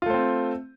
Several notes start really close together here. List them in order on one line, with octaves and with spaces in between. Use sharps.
F4 A3 C5 C4